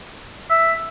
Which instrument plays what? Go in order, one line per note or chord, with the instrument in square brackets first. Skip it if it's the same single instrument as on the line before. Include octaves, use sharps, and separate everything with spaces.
[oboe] E5